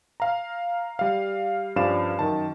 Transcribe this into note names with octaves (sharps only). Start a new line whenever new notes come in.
F5 A#5
G3 F5
G2 F3 C#4 D5 F5 E7
F#2 D#3 A5